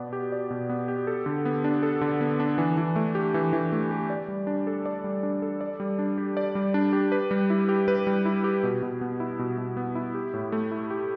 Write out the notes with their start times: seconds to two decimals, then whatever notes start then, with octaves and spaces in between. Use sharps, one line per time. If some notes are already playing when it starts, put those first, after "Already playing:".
Already playing: B2 B3 D5
0.13 G4
0.32 D5
0.51 B2
0.69 B3
0.88 G4
1.07 A4
1.26 D3
1.45 B3
1.64 D4
1.83 A4
2.01 D3
2.21 B3
2.40 D4
2.58 E3
2.77 E3
2.96 A3
3.15 G4
3.34 E3
3.53 E3
3.72 A3
3.91 G4
4.10 D5
4.28 G3
4.47 D4
4.67 A4
4.86 D5
5.04 G3
5.23 D4
5.42 A4
5.61 D5
5.80 G3
5.99 D4
6.18 G4
6.37 D5
6.55 G3
6.74 D4
6.93 G4
7.12 B4
7.31 G3
7.50 E4
7.69 G4
7.88 B4
8.07 G3
8.25 E4
8.44 G4
8.63 B2
8.83 B2
9.01 B3
9.20 E4
9.39 B2
9.58 B2
9.77 B3
9.95 E4
10.15 G4
10.34 A2
10.52 A3
10.72 E4
10.91 G4